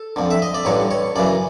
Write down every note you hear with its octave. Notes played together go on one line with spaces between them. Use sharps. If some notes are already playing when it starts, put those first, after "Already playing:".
Already playing: A4
F2 D3
E5
D#5
D5
A1 G2 D3 C#5
C#5
F#2 C#3 E3 D5